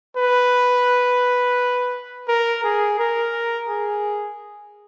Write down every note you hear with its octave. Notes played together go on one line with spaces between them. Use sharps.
B4
A#4
G#4
A#4
G#4